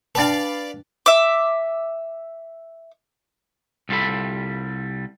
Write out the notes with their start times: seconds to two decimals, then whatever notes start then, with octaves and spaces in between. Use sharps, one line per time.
0.15 D4 B4 D5 F5 G5 A5
1.06 E5 D6
3.89 C2 G3 F4 A4 B5